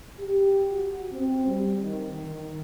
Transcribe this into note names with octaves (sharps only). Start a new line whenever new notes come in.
G4
F#4
C4
G3
D#3
D#3